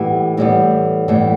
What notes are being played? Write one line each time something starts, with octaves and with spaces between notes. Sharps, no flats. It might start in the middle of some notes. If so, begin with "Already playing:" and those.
Already playing: A2 E3 G3 B3 G4
A2 E3 G3 B3
A2 E3 G3 B3